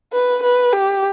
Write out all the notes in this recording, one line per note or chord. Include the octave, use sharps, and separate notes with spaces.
B4
B4
G4